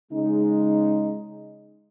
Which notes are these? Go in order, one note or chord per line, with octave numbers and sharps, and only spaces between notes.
C#3 G#3 D#4